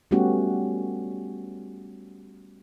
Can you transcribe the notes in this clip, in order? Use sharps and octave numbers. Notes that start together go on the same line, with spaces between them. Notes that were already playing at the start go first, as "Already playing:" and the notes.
G3 A3 B3 C#4 F#4 G4